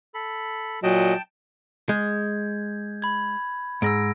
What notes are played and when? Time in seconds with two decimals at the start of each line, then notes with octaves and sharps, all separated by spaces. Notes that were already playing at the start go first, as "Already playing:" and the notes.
0.14 A4 B5
0.83 A#2 F#3 D#5 G5 A5
1.89 G#3 G6 G#6
3.02 B5 G#6
3.82 G#2 E6 A#6 D7